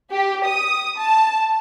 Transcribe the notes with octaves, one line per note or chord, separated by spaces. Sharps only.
G4
D#6
A5